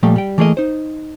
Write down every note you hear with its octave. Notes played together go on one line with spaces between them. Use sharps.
A#2 F3 G3 A3 F5 G5
G3 G5
E3 A3 A#3 G#4 A#4 D#5
D#4 C5